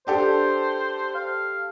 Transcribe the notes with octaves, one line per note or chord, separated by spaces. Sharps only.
D4 G4 A4 C5
F5